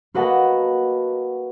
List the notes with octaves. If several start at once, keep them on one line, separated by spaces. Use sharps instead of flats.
A#3 F#4 B4 D#5 F#5 A5